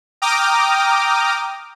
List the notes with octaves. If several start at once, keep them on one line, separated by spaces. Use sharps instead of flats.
G5 A#5 D6 D#6 F6